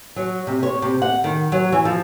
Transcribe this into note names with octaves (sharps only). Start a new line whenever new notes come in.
F#3
C3
C#5
C3
F#5
D#3
F#3
E3
F3